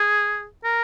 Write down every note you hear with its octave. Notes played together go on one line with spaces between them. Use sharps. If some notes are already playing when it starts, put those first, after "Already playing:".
Already playing: G#4
A#4